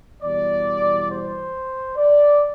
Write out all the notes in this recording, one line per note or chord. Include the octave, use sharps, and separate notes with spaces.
E2 B2 G3 D5
C5
D5